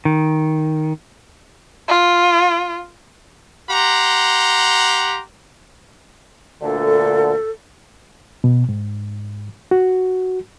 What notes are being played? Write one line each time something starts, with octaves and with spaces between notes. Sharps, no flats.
D#3
F4
G4 F#5 A#5 C6
D2 A#2 D3 A4
B2
G#2
F#4